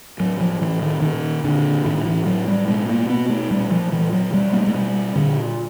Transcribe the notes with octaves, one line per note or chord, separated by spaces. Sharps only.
A2 F#3
F3
A2 E3
D#3
A#2 D#3
A#2 D3
A2 D#3
E3
A2 F#3
G3
B2 G#3
A#3
B2 B3
A3
A#2 G3
F3
A#2 E3
F#3
B2 G3
A#3
A3
G#3
B2 G3
A#2 D3